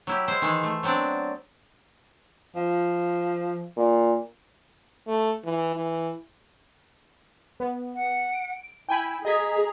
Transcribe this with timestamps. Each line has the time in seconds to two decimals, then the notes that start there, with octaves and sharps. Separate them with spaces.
0.07 F#3 E4 G4
0.28 G#3 E4 C5
0.42 D#3 E3 G#3
0.63 A3
0.83 F#3 B3 C4 D4 D5
2.56 F3
3.77 A#2
5.07 A3
5.45 E3
5.76 E3
7.60 B3
7.95 F#5
8.33 D7
8.89 E4 G5 G#5 B5
9.25 G#4 D#5 A#5 G#6 B6